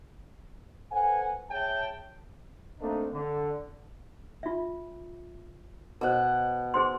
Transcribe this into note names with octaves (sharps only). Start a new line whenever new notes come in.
A4 B4 C5 F#5 G#5
G#4 C#5 E5 G5 A5
A3 A#3 C4 D4 D#4
D3
F4 E5
B2 A#4 C5 F#5
G#4 C5 C6